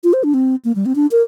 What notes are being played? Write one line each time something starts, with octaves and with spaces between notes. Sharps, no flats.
F4
C5
D4
C4
A#3
G3
C4
D4
A#4